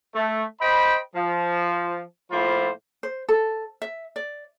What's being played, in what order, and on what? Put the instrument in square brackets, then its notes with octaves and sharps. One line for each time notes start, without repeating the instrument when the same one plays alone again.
[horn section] A3
C5 D#5 G5 B5
F3
A2 F3 A#3 F4 C5 B5
[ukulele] C5
A4
E5
D5